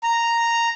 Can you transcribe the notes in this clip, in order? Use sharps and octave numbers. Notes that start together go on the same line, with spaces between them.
A#5